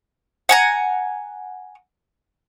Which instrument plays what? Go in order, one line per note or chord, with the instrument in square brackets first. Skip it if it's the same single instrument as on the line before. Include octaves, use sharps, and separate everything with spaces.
[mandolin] F#5 G#5 A#5